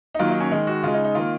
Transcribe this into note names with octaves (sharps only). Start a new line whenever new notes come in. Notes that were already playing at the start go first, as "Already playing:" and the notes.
D#4
D#3 F#3 A#3 F4
D#4
C#4
D#3 G#3 D#4
F#4
C#3 G#3 F4
D#4
D#4
D#3 A#3 F4